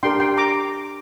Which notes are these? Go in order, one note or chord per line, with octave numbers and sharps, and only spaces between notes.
D4 G4 A#4 G5 C6
G5 C6
A#5 D6